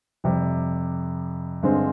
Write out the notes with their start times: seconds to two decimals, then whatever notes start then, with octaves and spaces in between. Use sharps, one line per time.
0.24 F2 C3 G3
1.63 G2 D3 G#3 C4